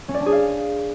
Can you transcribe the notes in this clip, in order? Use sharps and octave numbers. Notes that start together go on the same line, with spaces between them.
C#4
D5
D4
G#4
F5